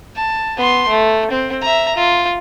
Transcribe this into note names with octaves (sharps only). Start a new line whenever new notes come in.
A5
B3 C6
A3
C4
E5 A#5
F4